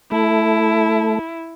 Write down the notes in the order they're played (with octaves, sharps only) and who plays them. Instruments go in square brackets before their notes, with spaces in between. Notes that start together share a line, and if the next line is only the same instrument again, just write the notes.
[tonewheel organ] A3 [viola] E4